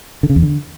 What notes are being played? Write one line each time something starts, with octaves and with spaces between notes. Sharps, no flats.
D3
C#3
E2
D3